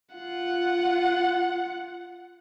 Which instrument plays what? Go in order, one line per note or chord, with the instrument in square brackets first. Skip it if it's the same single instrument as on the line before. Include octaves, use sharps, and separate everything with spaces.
[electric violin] F4 F#5